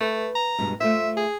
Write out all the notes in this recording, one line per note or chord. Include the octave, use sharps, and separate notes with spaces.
A3 B4
A#5
G2 B2 G#3
A3 F4 C5 E5
G#4